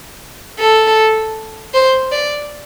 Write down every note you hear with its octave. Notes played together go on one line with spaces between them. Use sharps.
A4
C5
D5